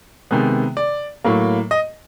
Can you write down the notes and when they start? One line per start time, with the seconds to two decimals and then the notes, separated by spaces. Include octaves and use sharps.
0.31 C3 D#3 G#3 B3
0.77 D5
1.24 A2 F#3 A#3
1.71 D#5